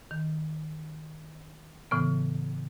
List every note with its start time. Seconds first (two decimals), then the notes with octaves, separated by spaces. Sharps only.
0.11 D#3
1.91 A2 C#3 E3 B3